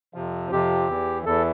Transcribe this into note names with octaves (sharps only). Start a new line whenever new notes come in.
F2 C3 F3
F2 C3 F3 G4
E2 E3
E2 E3 A4